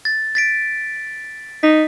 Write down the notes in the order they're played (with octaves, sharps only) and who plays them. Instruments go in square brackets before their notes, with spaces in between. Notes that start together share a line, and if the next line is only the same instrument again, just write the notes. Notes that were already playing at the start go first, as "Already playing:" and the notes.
[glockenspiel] A6
A6 B6 D7
[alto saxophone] D#4 [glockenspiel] B6